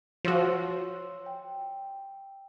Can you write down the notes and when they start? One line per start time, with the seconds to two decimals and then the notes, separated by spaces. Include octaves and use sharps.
0.25 F3 F#4 C#5 C6 E6
1.26 G5